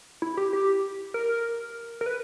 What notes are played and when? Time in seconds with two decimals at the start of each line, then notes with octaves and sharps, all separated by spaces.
0.22 E4
0.37 G4
0.53 G4
1.14 A#4
2.01 A#4
2.06 B4